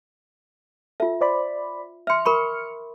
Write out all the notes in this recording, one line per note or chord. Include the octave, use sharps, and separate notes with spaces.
F4 A4 E5
C5 D5 B5
E5 C6 F6 C#7
A#4 B5 C#6